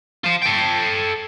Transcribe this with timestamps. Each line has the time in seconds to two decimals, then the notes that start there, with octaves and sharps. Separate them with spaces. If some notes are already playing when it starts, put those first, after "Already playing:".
0.24 F4 C5
0.42 A4 G5